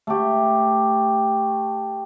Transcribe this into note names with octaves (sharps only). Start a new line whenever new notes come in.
A3 G4